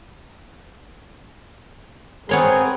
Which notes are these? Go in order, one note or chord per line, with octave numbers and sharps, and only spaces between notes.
B3 C4 G#4 A#4 C#5 C6